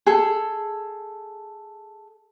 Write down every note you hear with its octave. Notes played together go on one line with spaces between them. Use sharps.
G#4 A4